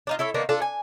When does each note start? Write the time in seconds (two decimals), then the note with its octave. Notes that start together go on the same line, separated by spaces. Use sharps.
0.07 D4 D#4 F4
0.19 E4 A4 C#5 E5
0.34 D#3 A#3 B3 D4
0.49 D4 F4 A4
0.62 G#5